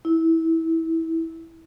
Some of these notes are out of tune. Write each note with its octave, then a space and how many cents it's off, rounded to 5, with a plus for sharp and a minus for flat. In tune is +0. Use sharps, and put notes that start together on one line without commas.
E4 -20